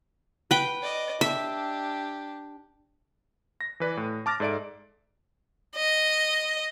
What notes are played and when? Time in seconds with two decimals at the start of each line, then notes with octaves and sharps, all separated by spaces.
0.51 B4 G5
0.82 D5 D#5
1.21 D4 G4 E5
3.61 A#6
3.80 E3 B4 D5
3.97 A2
4.26 A5 D6 F6 A6 A#6
4.40 G#2 A4 D5 E5 D7
5.76 D#5